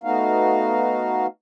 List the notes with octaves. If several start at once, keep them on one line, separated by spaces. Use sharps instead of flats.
A3 B3 D#4 F#4 F5